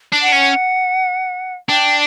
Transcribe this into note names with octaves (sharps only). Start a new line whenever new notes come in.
D4
F#5
C#4
D4 G5